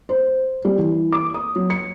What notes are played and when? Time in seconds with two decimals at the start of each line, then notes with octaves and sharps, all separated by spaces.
0.09 C5
0.65 G3
0.78 E3
1.12 D6
1.34 D#6
1.56 F#3
1.70 C#7